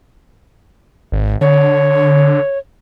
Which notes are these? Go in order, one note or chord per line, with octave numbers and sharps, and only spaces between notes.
G#1
D3 C#5